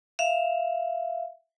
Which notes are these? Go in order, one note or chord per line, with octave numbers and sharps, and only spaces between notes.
E5 F5